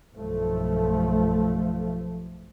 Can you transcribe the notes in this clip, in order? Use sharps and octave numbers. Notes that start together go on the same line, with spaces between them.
B1 G2 F3 A3